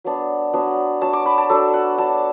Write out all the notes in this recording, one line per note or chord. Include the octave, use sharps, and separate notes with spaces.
F#3 B3 D4
F#3 B3 D4
F#3 D4 A5
D6
B5
A5
F#3 D4 A4
F#5
F#3 D4 A5